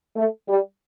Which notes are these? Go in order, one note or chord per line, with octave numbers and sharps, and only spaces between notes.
A3
G3